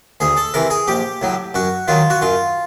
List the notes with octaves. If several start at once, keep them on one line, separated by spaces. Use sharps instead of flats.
D2 G#4
A4
C3 E3 A#4
G#4
A#1 G4
A2 F#3
F#2 F#4
D#3 F#3 F4
F#4
F#2 F4